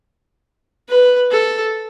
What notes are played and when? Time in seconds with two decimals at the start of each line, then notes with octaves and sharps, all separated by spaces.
0.89 B4
1.31 A4